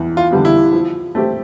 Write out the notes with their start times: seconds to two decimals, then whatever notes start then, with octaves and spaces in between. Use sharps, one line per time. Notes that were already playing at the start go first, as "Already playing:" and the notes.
Already playing: E2
0.17 F4
0.31 D3 G3 B3
0.45 E4
0.73 F3
1.15 A3 C4 G4